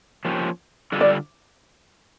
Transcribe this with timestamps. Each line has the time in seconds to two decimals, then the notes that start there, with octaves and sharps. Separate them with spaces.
0.25 F3 A#3 C#4 G4
0.92 D3 G3 D4 F4 A4
1.01 D5